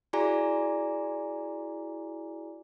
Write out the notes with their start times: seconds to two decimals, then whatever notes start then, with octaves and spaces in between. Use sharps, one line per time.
0.13 E4 F#4 G#4 D5 G#5 A#5